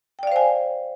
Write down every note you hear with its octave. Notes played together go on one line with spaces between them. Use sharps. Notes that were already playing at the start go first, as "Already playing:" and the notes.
C5 D5 F5 G5 G#5